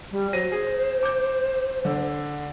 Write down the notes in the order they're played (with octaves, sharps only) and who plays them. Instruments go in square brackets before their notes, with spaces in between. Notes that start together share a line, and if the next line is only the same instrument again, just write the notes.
[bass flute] G3
[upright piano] F#3 A#6 D#7 [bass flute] C5
[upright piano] G#4
D6 G6
D3